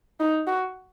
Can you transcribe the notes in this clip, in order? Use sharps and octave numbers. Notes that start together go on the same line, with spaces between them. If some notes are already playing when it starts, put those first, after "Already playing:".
D#4
F#4